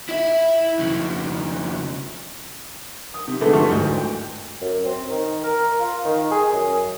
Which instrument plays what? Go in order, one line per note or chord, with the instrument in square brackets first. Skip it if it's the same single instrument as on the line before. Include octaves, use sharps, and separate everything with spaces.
[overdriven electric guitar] E4 E5
F2 C#3
[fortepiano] D#6
C3
D3 E3 G#3 A3
G2 F3 A3 E4 C#6
D2 G#2
G5
[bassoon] F#2
C4
D#3
A#4
F4
D#3
G#4
F#2